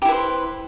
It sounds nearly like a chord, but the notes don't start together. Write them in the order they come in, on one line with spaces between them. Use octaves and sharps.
G4 E4 B4 C5